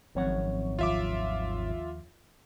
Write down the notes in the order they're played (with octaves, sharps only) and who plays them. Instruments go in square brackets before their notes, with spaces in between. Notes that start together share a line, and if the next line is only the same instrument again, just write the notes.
[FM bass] G#1 [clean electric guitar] F#2 C#5 F#5 [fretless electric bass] F3 C4
[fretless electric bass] D#2 F3 [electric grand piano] F4 E5 D6